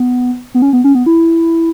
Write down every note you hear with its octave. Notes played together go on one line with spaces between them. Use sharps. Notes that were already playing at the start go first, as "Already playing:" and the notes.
Already playing: B3
B3
C#4
B3
C#4
B3
E4